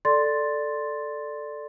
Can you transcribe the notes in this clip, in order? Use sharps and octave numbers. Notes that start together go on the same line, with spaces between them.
A4 D5 C6 A6